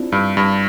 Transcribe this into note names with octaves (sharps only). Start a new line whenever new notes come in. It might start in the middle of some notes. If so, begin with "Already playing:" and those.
Already playing: C4 D4 E4 F4
G2
G2